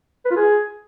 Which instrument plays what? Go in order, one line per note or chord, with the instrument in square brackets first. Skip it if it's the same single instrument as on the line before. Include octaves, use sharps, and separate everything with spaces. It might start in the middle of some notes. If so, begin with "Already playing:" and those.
[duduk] B4
F4
G#4